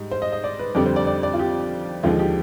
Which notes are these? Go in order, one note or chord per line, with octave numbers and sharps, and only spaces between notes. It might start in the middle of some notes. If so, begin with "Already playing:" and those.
Already playing: G#2 G3
C5
D#5
D#5
D5
B4
F2 D3 G3 D5
C5
D5
D5
D5
F4
G4
D#2 D3 F3 G#3 F4
G4